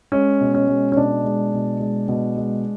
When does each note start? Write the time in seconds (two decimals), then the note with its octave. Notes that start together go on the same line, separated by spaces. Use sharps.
0.12 G#3 C#4
0.41 B2
0.54 C#4
0.68 G#3
0.92 C#4
0.97 B2 D4
1.24 G#3
1.53 B2
1.80 G#3
2.08 B2
2.37 G#3